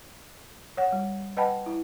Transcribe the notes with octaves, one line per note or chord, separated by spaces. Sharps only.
C#5 F#5
G3
B4 D#5 F#5 G5 A5 B5
E4